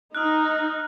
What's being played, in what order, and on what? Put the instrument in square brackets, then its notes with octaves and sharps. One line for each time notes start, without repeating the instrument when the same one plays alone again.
[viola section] D#4 [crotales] D#6 F6 F#6